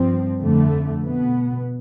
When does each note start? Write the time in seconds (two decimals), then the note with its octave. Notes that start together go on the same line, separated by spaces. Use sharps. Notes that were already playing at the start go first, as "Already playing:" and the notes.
Already playing: G2 F3 C4
0.38 F2 D3 A3
1.03 B2 B3